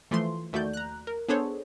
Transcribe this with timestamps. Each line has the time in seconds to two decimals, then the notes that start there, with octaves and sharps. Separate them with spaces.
0.11 E3 F3 A3 C6
0.53 D#2 A3 F#4 D5 G6
0.73 A#5 F#6
1.07 A#4
1.29 B3 D4 G#4 A4 C5 C#5